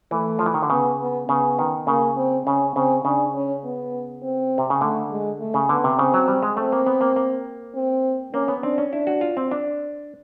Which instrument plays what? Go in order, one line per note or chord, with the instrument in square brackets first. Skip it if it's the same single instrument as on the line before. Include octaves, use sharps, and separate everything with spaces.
[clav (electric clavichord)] E3 [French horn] A3
[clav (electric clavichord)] F3
E3
D#3
D3
[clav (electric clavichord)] C#3 [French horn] B3
[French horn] B3
[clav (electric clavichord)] C#3 [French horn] B3
[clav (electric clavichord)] D#3
[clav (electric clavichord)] C#3 [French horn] A#3
[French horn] C4
[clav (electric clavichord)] C#3 [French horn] C#4
[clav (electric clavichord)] C#3 [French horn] C4
[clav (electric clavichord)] C#3 [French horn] D4
[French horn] C#4
B3
C4
[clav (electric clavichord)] C3
C#3
[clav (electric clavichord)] D3 [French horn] A3
[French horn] G#3
A3
[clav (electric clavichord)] C#3
[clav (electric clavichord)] D3 [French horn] B3
[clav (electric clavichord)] C3
[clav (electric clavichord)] C#3 [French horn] C4
[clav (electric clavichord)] F#3
G3
G#3
[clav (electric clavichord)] A3 [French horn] C4
[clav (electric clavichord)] A#3
B3
A#3
A#3
[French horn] C4
[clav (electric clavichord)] A#3 [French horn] C#4
[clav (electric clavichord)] B3
[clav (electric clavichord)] C4 [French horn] D4
[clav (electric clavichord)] C#4
[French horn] D4 [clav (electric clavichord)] E4
[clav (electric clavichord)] F#4
F4
C4
D4